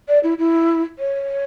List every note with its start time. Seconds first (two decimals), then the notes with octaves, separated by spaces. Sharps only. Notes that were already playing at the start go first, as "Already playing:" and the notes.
0.08 D5
0.23 E4
0.39 E4
0.99 C#5